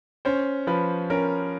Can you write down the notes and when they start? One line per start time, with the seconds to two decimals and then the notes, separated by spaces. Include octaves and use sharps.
0.25 C#4 C5
0.67 F3 B4
1.10 C#4 A#4